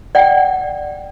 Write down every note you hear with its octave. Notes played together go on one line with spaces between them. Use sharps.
D5 F#5 G5